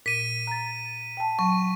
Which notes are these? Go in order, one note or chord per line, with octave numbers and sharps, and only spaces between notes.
A#2 B6 D#7
A#5 A6
G5 A5
F#3 C#6